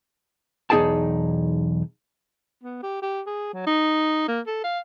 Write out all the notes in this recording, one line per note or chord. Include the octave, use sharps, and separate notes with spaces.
B1 E2 D#4 G#4 G5 A5
B3
G4
G4
G#4
F#3
D#4
A#3
A4
F5